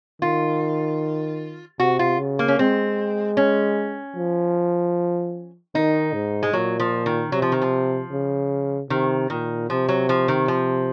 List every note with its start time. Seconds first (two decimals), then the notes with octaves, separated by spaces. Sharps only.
0.22 D#3 F4
1.80 C3 F#4
1.99 F4
2.19 C#3
2.39 A#3
2.48 C#4
2.59 G#3 C4
3.37 C#4
4.17 F3
5.75 D#3 D#4
6.14 G#2
6.43 G#3
6.53 A#2 F#3
6.80 F3
7.06 D#3
7.32 C3 F#3
7.42 F3
7.52 D#3
7.62 F3
8.11 C#3
8.90 C3 D#3
9.30 A#2 D#3
9.69 C3 F3
9.89 F#3
10.09 F3
10.28 D#3
10.48 F3